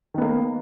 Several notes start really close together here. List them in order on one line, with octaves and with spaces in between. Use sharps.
D#3 B3 A#3